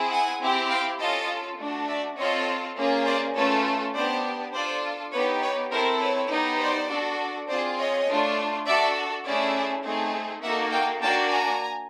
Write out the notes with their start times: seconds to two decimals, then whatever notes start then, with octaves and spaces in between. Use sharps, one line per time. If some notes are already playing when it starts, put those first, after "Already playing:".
Already playing: C4 E4 G#4
0.11 F#5 G#5
0.40 C4 E4 G4
0.70 F5 G5
0.99 C#4 F4 A4 D#5 F5
1.59 A3 D4 F#4
1.88 D5 E5
2.17 C4 F4 A4 C#5 D#5
2.76 A#3 C#4 F4 G#4
3.05 C5 D5
3.35 A3 C#4 F4 A4 B4 C#5
3.94 B3 D4 G4 C5 D5
4.53 D4 F4 A4 C5 D5
5.12 B3 D#4 G4 B4 C#5
5.42 B4 C#5
5.71 C4 E4 A4 A#4 C5
6.00 B4 C#5
6.30 B3 D#4 G4
6.60 C5 D5
6.89 D4 F#4 A4
7.48 C4 F4 G#4 C5 D5
7.77 C#5 D#5
8.07 A3 D4 F4
8.66 D4 F#4 A4 D5 E5
9.25 A3 C#4 E4 G#4 D5 E5
9.84 A3 C4 D#4 G#4
10.43 A#3 D#4 F#4 A4 E5 F#5
10.72 F5 G5
11.02 A#3 D4 F#4 G5 A5
11.31 G#5 A#5